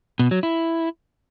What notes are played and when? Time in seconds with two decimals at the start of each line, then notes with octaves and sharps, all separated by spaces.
0.19 B2
0.31 F#3
0.43 E4